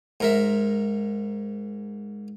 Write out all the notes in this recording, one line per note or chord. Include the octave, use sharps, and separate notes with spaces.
G#2 A#4 E5